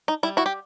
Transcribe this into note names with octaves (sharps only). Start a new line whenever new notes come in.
D#4
G3 E4
E4 F#4
G4